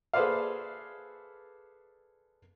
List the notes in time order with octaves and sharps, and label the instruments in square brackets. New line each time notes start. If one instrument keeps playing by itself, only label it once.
[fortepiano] G#4 A4 B4 C5 D5 F5